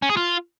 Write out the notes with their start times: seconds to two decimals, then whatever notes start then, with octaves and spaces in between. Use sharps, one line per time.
0.02 C#4
0.10 G#4
0.17 F4